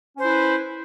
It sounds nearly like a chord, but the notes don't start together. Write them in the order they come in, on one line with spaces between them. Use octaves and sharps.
C#4 C5 E4 B4